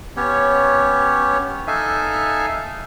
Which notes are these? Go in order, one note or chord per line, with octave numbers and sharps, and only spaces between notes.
B3 C#4 G4 C#5
D#4 A4 E5 F5 G#5